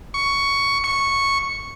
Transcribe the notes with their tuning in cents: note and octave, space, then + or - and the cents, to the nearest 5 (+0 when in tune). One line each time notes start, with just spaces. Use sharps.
C#6 +10
C#6 -5